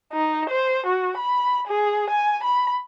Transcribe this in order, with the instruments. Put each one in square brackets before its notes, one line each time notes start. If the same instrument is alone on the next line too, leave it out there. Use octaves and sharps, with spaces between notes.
[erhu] D#4
C5
F#4
B5
G#4
G#5
B5